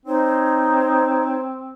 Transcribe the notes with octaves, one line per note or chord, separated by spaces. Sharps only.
C4 D#4 C5 C#5